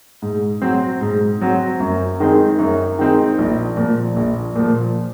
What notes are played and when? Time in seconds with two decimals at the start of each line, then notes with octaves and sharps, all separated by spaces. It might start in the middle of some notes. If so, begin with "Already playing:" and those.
0.22 G#2
0.62 F#3 C4
1.01 G#2
1.41 F#3 C4
1.80 F#2
2.20 D#3 G#3 C4 D#4
2.59 F#2
2.99 D#3 G#3 C4 D#4
3.38 A#1
3.77 A#2 F3
4.16 A#1
4.56 A#2 F3